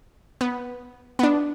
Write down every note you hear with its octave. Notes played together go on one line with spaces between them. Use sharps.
B3
B3
D4